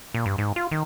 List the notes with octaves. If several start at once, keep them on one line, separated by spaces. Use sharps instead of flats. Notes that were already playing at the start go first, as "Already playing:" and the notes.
A#2
G2
G#2
F4
D#3